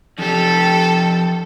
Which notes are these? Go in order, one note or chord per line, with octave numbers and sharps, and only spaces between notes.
F2 G4 A4